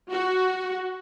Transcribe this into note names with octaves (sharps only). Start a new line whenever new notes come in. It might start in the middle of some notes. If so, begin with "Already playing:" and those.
F#4